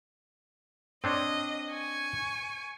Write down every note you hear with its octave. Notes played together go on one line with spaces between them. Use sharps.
C4 D4 C#5 D#5
G#5 C#6